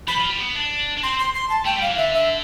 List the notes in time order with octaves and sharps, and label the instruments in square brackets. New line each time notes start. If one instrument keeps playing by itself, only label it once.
[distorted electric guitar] F3 [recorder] B5
[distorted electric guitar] F3
G3
B3
D4
D4
[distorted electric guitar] C4 [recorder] C6
[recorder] C6
C6
A5
[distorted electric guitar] A3 [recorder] G5
[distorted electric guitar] G3
[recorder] F5
[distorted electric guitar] E3
[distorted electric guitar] D3 [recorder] E5
[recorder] E5